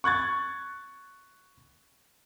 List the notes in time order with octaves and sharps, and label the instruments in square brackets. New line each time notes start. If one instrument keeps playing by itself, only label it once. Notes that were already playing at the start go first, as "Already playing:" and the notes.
[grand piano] C#6 F#6 G#6 A6